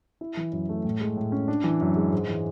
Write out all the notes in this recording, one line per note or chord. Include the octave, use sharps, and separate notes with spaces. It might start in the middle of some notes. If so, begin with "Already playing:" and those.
E4
E3
F#2
A3
A2
G#3
A2
C#4
D4
E3
F#2
G#3
G#2
E3